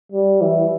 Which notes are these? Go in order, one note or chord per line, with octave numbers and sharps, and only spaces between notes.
G3
E3